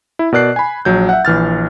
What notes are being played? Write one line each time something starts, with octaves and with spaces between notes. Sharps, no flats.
E4
B2 A#4 D5 F#6 C7
G#5 B5
A#1 F#3 G6
E5 F#5
A#1 E3 F6 A6